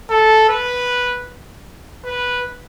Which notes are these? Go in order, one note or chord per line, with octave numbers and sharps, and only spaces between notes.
A4
B4
B4